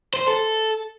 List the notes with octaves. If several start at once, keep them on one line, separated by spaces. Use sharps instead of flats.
C5
A4